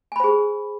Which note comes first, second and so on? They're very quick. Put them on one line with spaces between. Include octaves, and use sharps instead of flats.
G#5 B5 C5 G#4